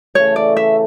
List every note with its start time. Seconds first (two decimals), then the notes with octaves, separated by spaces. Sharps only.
0.15 C#3 E3 A3 C#5
0.36 D5
0.57 E5